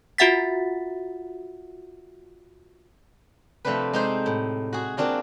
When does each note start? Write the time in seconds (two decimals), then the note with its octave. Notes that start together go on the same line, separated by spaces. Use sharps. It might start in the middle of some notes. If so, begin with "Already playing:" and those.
0.18 F4 F#4 E5 F#5 A6 B6
3.65 C3 F3 A3 C4 D4 B4
3.93 G#3 C4 D#4 G4 A4 C5
4.26 A2
4.73 F#4 G#4
4.97 A#3 C4 D4 F4 F#4